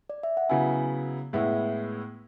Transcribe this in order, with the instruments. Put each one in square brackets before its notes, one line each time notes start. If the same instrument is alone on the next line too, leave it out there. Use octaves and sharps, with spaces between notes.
[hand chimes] D5
E5
F#5
[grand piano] C#3 F#3 B3 E4 [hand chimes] G#5
[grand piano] A2 G#3 B3 E4 [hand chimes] E5